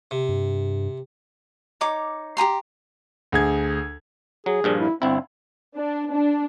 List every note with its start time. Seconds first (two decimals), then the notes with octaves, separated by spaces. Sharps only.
0.11 C3
0.29 G2
1.81 D#4 C#5 D6
2.37 G4 G#5 A#5 C6
3.32 D2 G#4 G#6
4.46 F#3 G#4
4.64 G2 A#2 F3
4.80 E4
5.02 G1 C4 E4
5.76 D4
6.13 D4